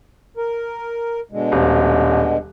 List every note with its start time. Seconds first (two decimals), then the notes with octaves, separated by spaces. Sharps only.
0.37 A#4
1.31 B2 D3 G#3
1.52 D#1